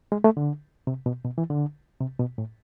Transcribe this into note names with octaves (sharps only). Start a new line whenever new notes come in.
G#3
A3
D3
C3
B2
B2
E3
D3
C3
B2
A2